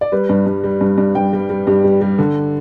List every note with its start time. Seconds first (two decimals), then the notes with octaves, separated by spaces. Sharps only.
0.01 D5
0.12 G3 B4
0.29 G2
0.46 G2
0.64 G3
0.81 G2
0.98 G2
1.15 G2 G5
1.33 G3
1.50 G3
1.67 G2 G4
1.84 G3
2.01 G3
2.18 D3 A4